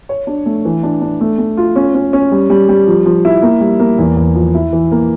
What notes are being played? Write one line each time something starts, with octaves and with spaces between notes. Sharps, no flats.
C#5
D4
A3
E3
D4
D4
A3
A3
F4
C#4
C#4
C#4
G3
G3
G3
F3
F3
E4
A#3
G3
A#3
E2
E2
F3
E4
E3
A#3